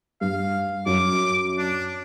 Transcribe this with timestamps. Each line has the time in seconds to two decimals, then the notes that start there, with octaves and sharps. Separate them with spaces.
0.21 G2 F5
0.86 F#2 D6
1.58 D4